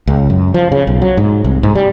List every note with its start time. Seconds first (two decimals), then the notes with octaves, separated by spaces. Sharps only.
0.07 C#2
0.30 F#2
0.54 F3
0.72 C#3
0.87 B1
1.02 F#3
1.17 G#2
1.44 C2
1.63 G#2
1.75 G3